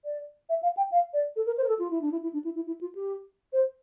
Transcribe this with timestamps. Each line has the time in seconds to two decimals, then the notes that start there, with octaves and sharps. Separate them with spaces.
0.05 D5
0.49 E5
0.63 F5
0.77 G5
0.92 F5
1.13 D5
1.36 A4
1.46 A#4
1.58 C5
1.64 A#4
1.68 A4
1.79 F4
1.90 E4
2.01 D4
2.12 E4
2.23 E4
2.33 D4
2.44 E4
2.55 E4
2.67 E4
2.81 F4
2.95 G4
3.53 C5